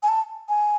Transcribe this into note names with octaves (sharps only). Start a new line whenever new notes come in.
G#5
A5
G#5